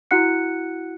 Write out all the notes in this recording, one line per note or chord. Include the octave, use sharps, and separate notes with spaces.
E4 F#4 F#5 F#6 C#7